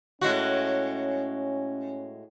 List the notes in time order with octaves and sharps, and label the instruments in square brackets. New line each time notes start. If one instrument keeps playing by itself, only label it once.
[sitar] A2 G#3 F#4 [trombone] C#4